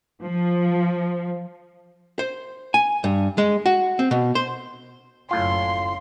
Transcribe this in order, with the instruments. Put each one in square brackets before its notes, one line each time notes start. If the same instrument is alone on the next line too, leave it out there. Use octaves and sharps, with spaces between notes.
[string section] F3
[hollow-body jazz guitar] C5
G#5
G2
G#3
F#4
C4
B2
C5
[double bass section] F#1 F#2 C#4 [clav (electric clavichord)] A2 F4 [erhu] C6